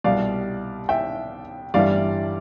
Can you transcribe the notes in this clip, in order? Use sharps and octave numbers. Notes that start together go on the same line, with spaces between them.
C2 B2 G3 D5 F5
E5 G5
G1 G2 E3 G3 D5 F5